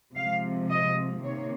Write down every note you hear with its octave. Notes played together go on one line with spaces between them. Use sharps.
C3 F3 G#3 F5
D#5
C3 D#3 A#3 C#5